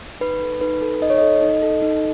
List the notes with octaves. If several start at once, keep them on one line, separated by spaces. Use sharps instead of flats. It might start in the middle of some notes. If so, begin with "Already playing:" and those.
D#4 B4
A4
D#4 B4
A4
D#4 D#5
C#5
A4 D#5
D#4
A4
D#4